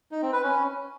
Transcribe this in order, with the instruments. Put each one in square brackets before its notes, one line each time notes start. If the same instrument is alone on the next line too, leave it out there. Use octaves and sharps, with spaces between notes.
[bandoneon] D#4
C4
B4
C#4